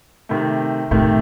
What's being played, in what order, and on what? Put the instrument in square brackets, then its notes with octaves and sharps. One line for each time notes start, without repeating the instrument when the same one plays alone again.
[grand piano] C3 D#3 A3
[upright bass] A2 [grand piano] C3 D#3 A3